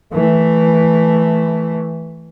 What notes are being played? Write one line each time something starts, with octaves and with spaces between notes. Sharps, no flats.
E3 A3